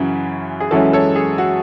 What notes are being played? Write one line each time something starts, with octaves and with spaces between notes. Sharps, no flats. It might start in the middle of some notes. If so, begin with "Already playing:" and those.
Already playing: F#2 C#3 E3 F#4
G#4
F#2 E3 G#3 C#4 E4 F#4 A4
A4 C#5
G#4
F#4